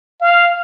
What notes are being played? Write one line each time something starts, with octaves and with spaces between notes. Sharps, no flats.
F5